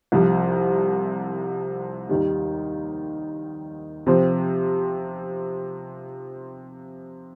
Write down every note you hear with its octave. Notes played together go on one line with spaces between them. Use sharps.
C2 C3 F3
D#2 D#3 G3
C3 F3 C4